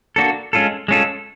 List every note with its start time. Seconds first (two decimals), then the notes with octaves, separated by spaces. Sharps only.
0.16 A#3 D4 F#4 A4
0.53 G#3 C#4 F4 A4
0.88 G#3 C#4 F4 A4